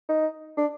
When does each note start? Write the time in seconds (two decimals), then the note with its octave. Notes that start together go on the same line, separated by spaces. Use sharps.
0.09 D#4
0.57 D4